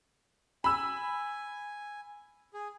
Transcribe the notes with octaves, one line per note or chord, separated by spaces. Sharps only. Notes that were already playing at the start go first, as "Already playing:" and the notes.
G#5 B5 E6
G#4